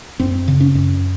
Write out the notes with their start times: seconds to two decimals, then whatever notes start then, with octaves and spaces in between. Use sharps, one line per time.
0.20 F#2 C4
0.48 C#3
0.60 C#4
0.75 F#2